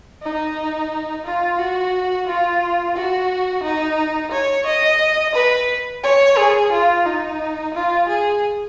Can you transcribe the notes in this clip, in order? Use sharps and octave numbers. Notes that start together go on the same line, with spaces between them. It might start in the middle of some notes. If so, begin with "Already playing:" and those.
D#4
F4
F#4
F4
F#4
D#4
C#5
D#5
B4
C#5
G#4
F4
D#4
F4
G#4